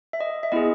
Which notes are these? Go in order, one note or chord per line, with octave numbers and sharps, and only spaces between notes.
E5
D#5
E5
B3 E4 G#4 D#5